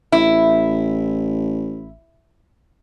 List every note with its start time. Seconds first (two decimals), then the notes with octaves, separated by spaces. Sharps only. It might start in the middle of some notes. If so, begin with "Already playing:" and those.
0.12 A1 E4